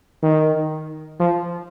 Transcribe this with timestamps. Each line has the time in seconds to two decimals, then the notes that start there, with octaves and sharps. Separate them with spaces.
0.23 D#3
1.20 F3